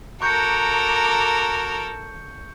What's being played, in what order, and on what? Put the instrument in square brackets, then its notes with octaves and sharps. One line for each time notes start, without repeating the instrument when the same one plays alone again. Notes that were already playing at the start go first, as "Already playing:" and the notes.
[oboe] F#4 [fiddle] A4 A#4 [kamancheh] A#5 D6 [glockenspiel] C#6 G6 C#7